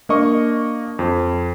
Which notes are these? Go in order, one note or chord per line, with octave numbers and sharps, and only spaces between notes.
A#3 D4 D#5 C#6
F2